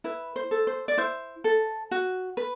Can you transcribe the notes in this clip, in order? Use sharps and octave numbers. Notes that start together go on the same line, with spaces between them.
E4 B4
C5
A4
C5
D5
E4 C5
A4
F#4
B4